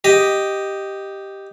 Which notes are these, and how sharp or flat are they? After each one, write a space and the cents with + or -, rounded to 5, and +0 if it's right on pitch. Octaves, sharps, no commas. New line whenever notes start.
G4 +0 D#5 +0